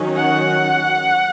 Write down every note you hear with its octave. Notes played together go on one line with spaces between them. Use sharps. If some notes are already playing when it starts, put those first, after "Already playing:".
Already playing: D#3 F#3 C#4
F#5